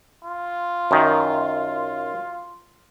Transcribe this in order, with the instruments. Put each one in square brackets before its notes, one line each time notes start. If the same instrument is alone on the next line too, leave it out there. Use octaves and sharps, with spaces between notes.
[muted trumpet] F4
[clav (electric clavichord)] F#2 D#3